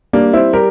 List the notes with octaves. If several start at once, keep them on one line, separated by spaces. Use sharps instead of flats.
G3 A#3 D4
C4 E4
G3 G4 A#4